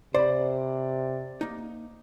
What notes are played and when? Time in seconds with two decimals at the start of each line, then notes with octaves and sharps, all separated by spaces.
0.14 C3 C5 D5 B5
1.41 A#3 D#4